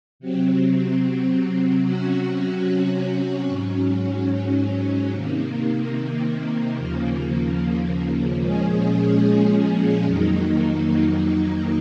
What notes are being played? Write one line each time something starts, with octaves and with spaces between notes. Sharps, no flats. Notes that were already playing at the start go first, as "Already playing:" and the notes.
C3 F#3 C4
C3 F#3 C#4 F#4
G#2 F#3 C#4
C3 D#3 A#3
D#2 C#3 F3 A#3
A#2 F3 G#3 C#4 G#4
F2 D#3 F#3 A#3 D#4